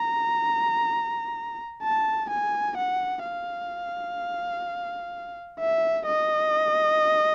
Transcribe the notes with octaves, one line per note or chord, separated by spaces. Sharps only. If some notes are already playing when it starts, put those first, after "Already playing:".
Already playing: A#5
A5
G#5
F#5
F5
E5
D#5